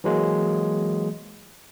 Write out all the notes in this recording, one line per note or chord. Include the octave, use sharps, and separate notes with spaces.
E3 F#3 G#3 A#3